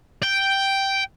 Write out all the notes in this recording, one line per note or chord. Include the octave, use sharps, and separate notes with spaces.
G5